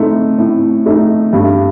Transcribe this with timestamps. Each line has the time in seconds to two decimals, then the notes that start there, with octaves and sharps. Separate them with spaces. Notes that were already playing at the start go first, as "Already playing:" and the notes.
Already playing: A2 A3 C4 D#4
0.38 A2
0.86 A3 D#4
1.33 G2